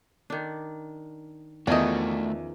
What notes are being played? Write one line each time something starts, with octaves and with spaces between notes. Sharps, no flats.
D#3 D4
E2 D#3 F3 A3 C#4 D4 F#4 D#5